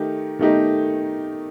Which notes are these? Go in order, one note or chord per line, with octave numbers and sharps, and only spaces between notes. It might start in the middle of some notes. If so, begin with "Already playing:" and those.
Already playing: D#3 A3 D#4 G4
D#3 A3 D#4 G4